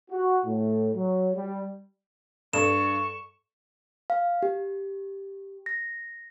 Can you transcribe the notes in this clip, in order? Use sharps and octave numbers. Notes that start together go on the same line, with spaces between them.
F#4
A2
F#3
G3
G2 A4 D5 C#6 E7
F5
G4
A#6